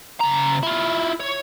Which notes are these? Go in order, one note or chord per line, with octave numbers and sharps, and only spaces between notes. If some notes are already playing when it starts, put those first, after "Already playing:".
C#3 A#5
E4 F4
C#5